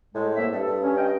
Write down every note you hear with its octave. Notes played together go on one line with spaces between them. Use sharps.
A2 G#3
C2 A#3 E5
G2 A4
G2
C#4
D#5 G5